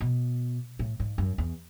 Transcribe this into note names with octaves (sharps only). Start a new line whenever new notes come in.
B2
A2
G#2
F#2
E2